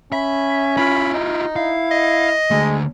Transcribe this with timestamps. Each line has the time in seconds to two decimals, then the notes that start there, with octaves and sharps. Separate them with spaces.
0.12 C#4 E5 B5
0.77 E4 F4 B5
1.14 D#4
1.56 E4 F5
1.91 D#5
2.51 D3 G#3 A3